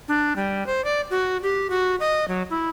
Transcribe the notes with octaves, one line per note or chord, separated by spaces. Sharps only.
D4
G3
C5
D5
F#4
G4
F#4
D#5
F#3
E4